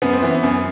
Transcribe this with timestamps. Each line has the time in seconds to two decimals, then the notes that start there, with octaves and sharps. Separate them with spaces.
0.02 F#2 B3
0.13 C4
0.22 E3 B3
0.43 F#2